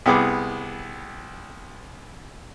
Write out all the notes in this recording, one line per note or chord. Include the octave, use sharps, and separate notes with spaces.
C2 B3 G#4 D6